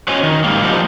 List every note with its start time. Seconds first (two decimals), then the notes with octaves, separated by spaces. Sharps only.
0.08 C#4 F#4 C5 C#5 D#5 G#5
0.23 D#3
0.44 G#2 G3 A#3
0.62 F3 G3 D#4